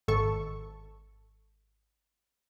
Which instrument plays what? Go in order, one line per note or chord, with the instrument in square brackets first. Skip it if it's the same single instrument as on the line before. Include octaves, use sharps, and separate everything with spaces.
[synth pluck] G#1 A4 C#6